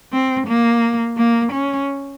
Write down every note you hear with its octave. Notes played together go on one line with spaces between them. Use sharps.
C4
A#3
A#3
C#4